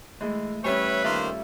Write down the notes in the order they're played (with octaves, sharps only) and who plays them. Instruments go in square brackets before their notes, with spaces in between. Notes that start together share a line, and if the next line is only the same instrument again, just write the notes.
[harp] E3 A3 [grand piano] G#3
[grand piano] G3 C#4 [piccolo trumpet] B4 [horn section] C#5 E5
[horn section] D#3 A#3 C5 [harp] F4 A4 E5